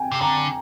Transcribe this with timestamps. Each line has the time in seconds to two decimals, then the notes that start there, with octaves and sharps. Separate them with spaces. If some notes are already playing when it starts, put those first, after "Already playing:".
Already playing: G5 G#5
0.12 C3
0.21 D3 A#5